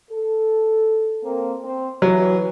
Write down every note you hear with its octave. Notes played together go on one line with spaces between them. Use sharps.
A4
A#3 C4
C4
E3 F#3